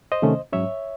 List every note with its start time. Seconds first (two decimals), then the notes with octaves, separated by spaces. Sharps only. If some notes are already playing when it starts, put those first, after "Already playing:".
0.12 C5 D#5
0.22 C3 D#3 A3 C#4
0.53 G#2 F#3 C#4 C#5 E5